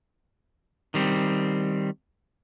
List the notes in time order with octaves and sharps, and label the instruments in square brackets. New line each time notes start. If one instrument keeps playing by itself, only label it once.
[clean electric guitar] D#3 G3 C4